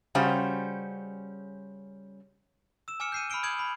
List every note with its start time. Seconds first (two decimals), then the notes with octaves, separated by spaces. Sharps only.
0.15 C#3 G3 C#4 F#4 C5
2.88 E6 E7
3.00 G#5 D6 F6 C#7 E7
3.12 G6 C7 D#7
3.30 B5 F6 C7 D7 G7
3.43 D#6 G6 G#6 D7 F#7
3.59 B5